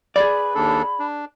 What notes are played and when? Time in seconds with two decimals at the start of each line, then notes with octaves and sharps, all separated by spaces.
0.16 G#4 B4 D5 B5
0.55 D#2 D4 A4
0.99 D4